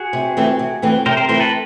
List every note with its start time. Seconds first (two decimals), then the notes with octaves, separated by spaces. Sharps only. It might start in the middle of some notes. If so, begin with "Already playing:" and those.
Already playing: F#4 G#4
0.13 C3
0.37 E3 A3 C4
0.59 C3
0.82 E3 A3 C4
1.06 C3 A#4 C5
1.17 A#4 C5
1.29 E3 A3 C4 A#4 C5
1.40 A4 B4